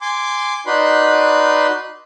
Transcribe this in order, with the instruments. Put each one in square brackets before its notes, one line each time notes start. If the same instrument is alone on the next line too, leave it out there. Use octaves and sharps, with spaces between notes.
[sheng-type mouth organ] G#5 C6 D6
D#4 F#4 B4 D5 B5 C6